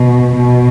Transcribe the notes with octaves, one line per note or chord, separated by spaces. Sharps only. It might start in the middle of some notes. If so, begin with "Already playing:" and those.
Already playing: B2
B2